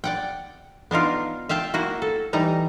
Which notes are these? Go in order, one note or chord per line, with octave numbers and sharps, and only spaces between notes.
D5 F#5 G5
B3 D4 D#4 F4
E5 F5 G5 A5
A#3 E4 F#4
A4
E3 G3 D#4 A#5